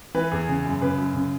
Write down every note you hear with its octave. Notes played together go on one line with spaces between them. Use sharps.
E3 B4
E2 G#4
C#3
F#2
C#3 B4
F#2
C#3